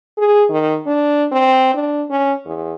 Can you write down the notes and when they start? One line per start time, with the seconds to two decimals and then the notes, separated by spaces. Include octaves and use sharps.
0.18 G#4
0.50 D#3
0.87 D4
1.32 C4
1.74 D4
2.10 C#4
2.45 E2